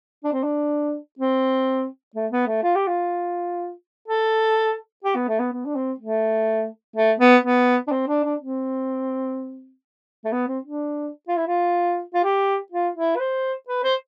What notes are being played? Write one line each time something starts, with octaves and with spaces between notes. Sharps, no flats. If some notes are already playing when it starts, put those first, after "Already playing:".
D4
C4
D4
C4
A3
B3
A3
F4
G4
F4
A4
G4
B3
A3
B3
B3
D4
C4
A3
A3
B3
B3
D4
C4
D4
D4
C4
A3
B3
C4
D4
F4
E4
F4
F4
G4
F4
E4
B4
C5
B4
C5